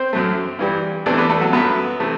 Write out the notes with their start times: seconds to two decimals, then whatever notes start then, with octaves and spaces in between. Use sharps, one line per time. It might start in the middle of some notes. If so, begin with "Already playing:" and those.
Already playing: C4 C5
0.13 F#2 F#3 A3
0.59 G2 E3 G3
1.06 E2 C3 E3 A3 D4 D5
1.18 B3 B4
1.30 A3 A4
1.41 F#3 F#4
1.53 F#2 F#3 A3 B3 B4
2.00 C3 E3 A3